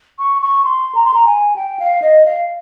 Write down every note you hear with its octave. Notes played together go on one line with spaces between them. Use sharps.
C#6
C#6
C6
A#5
C6
A#5
G#5
G5
F5
D#5
F5